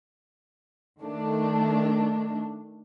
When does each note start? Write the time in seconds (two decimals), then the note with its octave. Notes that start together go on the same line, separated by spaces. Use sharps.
1.01 D#3 A3 D4